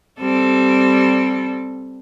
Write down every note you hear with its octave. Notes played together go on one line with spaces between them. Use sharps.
G3 C4 A4